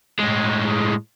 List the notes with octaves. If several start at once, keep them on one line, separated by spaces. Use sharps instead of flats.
A2 G#3